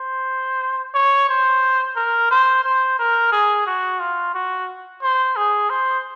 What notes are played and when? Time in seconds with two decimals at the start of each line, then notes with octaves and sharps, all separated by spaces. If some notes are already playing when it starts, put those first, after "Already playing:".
Already playing: C5
0.94 C#5
1.29 C5
1.96 A#4
2.31 C5
2.64 C5
2.99 A#4
3.32 G#4
3.67 F#4
4.00 F4
4.34 F#4
5.03 C5
5.36 G#4
5.70 C5